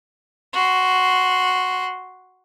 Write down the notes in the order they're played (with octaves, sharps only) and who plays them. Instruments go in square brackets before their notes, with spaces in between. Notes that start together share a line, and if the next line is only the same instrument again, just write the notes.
[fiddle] F#4 C6